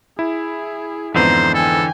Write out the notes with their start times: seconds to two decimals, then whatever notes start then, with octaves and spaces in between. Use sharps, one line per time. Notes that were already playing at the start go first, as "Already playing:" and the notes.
0.19 E4 G#4
1.15 F2 G#2 D3 E3 B3 C5 A#5
1.54 A4 G5 G#5